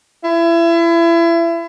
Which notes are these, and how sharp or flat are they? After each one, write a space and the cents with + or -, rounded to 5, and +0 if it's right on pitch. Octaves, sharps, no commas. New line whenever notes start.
E4 +30